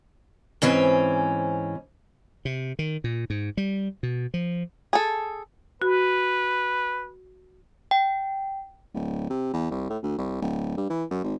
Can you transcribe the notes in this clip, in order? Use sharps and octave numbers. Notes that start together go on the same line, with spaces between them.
G#2 E3 C4 C#4
C3
D#3
A#2
G#2
G3
B2
F3
G#4 A4
F#4 B4
G5
D1
C3
E2
C2
A2
D2
C2
D1
G2
E3
F#2
G#1